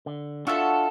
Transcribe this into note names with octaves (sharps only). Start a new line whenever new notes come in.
D3
D4 F4 F#4 A4 E5